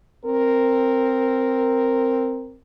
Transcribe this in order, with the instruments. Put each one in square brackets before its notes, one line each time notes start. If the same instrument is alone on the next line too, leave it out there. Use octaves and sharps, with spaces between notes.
[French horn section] C4 A#4